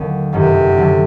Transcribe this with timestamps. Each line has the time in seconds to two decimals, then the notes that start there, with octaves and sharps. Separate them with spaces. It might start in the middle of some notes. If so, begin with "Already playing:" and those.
Already playing: D#2 D3 F#3 A3
0.32 G1 F#2 C3 D#3
0.77 D3 F#3 A3 D4